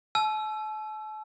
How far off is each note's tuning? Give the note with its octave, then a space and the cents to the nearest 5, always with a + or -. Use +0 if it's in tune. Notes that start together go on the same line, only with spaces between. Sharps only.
A5 -40 E6 +20